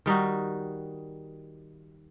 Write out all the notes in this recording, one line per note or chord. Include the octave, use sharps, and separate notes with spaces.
D#3 G3 D#4 F#4